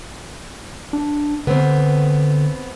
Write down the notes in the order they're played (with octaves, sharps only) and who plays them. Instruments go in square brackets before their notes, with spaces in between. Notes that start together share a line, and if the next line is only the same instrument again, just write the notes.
[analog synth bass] D4
[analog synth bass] D3 [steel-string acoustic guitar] B3 C4